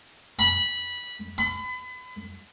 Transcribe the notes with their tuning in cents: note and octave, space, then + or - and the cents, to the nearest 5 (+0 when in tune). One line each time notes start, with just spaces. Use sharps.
B5 -15
B5 +35